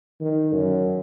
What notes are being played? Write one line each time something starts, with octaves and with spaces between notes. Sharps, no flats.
D#3
F#2